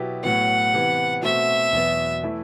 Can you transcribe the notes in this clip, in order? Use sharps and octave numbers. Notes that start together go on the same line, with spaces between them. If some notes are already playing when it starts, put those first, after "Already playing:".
Already playing: B2 F#3 B3 E4 G4
A2 F#3 B3 F#5
C3 E3 B3
B2 A3 C4 F#4 E5
E2 B2 F#3 B3
E3 A3 E4